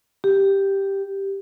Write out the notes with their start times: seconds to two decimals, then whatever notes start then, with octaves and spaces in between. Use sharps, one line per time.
0.24 G4